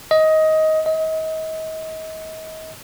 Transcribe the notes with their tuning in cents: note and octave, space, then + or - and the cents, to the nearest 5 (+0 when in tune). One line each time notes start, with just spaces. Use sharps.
D#5 +15
D#5 +35